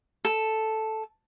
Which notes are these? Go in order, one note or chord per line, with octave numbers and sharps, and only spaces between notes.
A4